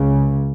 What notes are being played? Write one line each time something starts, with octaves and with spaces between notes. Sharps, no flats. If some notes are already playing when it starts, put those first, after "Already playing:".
Already playing: C#2 C#3